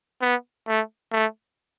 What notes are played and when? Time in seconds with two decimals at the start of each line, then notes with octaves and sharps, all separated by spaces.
0.22 B3
0.67 A3
1.12 A3